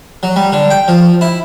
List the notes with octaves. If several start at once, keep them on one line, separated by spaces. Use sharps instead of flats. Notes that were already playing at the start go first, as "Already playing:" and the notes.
F#3
G3
D3
G5
F3
E4